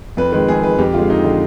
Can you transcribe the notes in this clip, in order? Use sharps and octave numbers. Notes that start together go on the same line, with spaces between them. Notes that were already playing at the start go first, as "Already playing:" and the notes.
F2 B4
D#3 G#3 B4
F2 G#4
D#3 G#3 B4
F2 G4
D3 G#3 F4
F2 D#4
D3 G#3